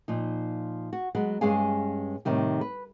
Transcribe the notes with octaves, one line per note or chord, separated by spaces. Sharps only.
A#2 F3 D#4
F#4
F#3 G#3 B3
G2 G#3 C#4 G#4 F5 G#5
A2 C3 D#3 G3
B4